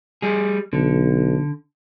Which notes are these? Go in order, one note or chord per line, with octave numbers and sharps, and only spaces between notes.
G3 G#4
B1 D3